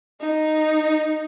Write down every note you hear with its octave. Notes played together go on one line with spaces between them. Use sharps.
D#4